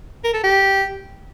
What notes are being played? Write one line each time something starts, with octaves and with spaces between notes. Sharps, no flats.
A#4
A4
G4